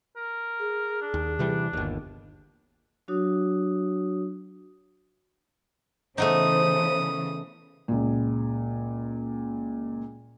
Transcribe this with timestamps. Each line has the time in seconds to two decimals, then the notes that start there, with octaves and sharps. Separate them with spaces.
0.17 A#4
0.59 G#4
1.01 D4
1.14 D#2
1.39 C3 E3 G3
1.73 G1 D#2
3.08 F#3 D4 F#4 C#5 D#6
6.18 C#3 E3 A3 B3 D#4 C5 D#6
7.88 C#2 A#2